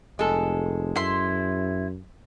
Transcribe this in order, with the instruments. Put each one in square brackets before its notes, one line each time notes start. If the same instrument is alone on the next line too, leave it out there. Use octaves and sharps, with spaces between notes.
[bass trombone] F1 [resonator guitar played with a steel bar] G#3 A4
[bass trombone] F#2 [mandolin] E4 C6